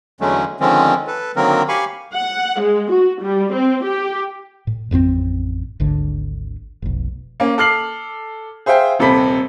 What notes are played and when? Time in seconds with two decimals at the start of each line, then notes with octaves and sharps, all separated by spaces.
0.21 E2 D3 F#3 G#3 A3 C#4
0.60 D3 D#3 F3 G#3 C4 C#4
1.07 A4 B4
1.36 D3 D#3 F#3 A#3 C4 A#4
1.68 G4 F5 G#5 B5 C#6
2.14 F#5
2.60 G#3
2.91 F#4
3.21 G3
3.54 C4
3.84 G4
4.67 A2
4.91 A1 F2 A#3 C4
5.80 G#1 D2 D3
6.82 F1 B1
7.40 A#3 C#4
7.58 A4 D6 F6 C7 F#7
8.66 G#4 C5 E5 F5 G5
8.99 D#1 C3 C4 A4 B5 B6